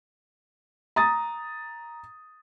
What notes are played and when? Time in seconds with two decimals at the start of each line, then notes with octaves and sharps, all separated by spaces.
0.96 A#5 D#6 A6